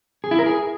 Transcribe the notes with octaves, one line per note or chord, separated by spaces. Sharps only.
G#4
E4
A#4
G#4